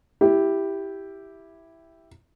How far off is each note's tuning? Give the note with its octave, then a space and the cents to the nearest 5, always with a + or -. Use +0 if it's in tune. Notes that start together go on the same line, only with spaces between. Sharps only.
E4 +0 G4 +0